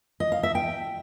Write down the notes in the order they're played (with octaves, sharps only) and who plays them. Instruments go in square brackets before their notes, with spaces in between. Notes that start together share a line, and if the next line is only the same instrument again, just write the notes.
[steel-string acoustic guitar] D#5
F5
E5
G5